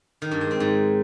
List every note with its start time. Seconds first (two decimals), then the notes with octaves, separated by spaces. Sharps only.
0.22 D#3
0.31 G2
0.41 G#3
0.51 C4
0.60 G#2